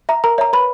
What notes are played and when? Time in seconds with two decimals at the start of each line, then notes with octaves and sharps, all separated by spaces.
0.09 E5 A#5
0.24 A#4 A#5
0.38 C#5 E5 A#5
0.53 B4 B5